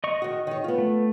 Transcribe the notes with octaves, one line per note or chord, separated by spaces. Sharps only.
D#5 C#6
D#3 F#4
D#3 C#5
B3 F4
A3